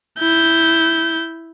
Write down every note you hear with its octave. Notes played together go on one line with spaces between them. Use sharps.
E4 G6